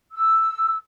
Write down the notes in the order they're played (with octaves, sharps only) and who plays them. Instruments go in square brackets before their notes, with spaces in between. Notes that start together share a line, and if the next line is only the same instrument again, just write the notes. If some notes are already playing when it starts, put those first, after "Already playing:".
[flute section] E6